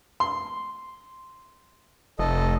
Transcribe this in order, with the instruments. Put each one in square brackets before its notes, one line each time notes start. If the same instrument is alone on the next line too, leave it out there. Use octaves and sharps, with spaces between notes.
[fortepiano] C6
[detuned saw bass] F1 [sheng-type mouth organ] A4 D#5